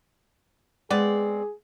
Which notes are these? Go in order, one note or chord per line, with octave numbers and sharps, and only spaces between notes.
G#3 B3 C4 G#4 D5